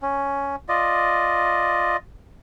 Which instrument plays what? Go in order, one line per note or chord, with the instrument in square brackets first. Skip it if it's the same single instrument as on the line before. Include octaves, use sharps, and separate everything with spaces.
[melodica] C#4
F4 D5 D#5